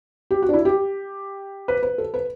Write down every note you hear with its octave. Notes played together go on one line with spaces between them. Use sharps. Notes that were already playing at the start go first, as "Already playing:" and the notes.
G4
F#4
D4
E4
G4
B4
B4
A4
B4